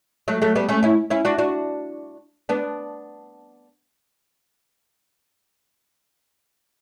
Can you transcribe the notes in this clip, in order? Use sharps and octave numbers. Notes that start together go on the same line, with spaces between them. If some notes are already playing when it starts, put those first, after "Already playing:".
F#3 A3
F#3 A3
G3 B3
A3 C#4
C#4 E4
C#4 E4
D4 F#4
D4 F#4
B3 D4